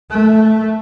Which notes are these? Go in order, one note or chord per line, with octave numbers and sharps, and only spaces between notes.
A3